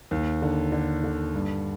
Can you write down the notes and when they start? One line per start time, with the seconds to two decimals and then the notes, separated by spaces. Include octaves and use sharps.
0.11 D#2
0.42 D3
0.72 D3
1.04 D3
1.34 G2